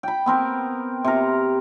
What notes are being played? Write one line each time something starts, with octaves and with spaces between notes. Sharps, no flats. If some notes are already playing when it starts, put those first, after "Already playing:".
G5 B5
B3 C4 A#4
C3 A#4